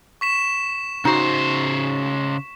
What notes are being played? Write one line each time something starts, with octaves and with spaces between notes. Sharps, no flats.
C#6 B6 E7
C#3 D#4 F#4 C5